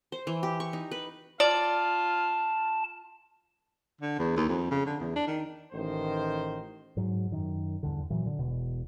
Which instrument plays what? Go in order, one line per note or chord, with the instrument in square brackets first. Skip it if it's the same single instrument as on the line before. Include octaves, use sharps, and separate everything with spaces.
[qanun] C5
E3
G4
C#6
D#4
B4
[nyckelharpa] F4 [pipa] D5 [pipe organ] A5
[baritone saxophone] D3
E2
D#2
F2
C#3
D3
E2
D4
D#3
[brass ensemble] A1 D#3 C5
[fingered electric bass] G#2 F#3
F#2 D#3
E2 G2 D3
A#2 E3 F#3
D3
E1 B2